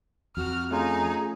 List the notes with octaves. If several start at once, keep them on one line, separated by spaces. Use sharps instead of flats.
F2 F#4 F6
A3 C#4 D#4 F4 G#4